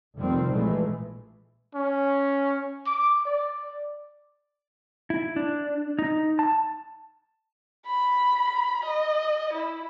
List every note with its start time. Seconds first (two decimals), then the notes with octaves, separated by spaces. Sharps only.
0.17 F1 D#3 F3 G3 C4
0.50 A#1 A#2 E3 G#3 A3
1.75 C#4
2.87 D6
3.25 D5
5.10 E4
5.36 D4
5.99 D#4
6.39 A5
7.87 B5
8.85 D#5
9.53 E4